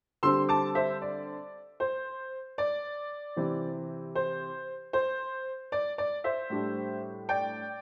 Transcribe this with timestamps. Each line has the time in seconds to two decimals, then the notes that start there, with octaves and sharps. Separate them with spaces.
0.23 D3 G3 C4 C6 E6
0.49 A5 D6
0.75 C5 E5
1.02 D5
1.80 C5
2.58 D5
3.36 C3 E3 C4
4.15 C5
4.93 C5
5.72 D5
5.98 D5
6.24 C5 E5
6.50 A2 G3 D4
7.29 D5 G5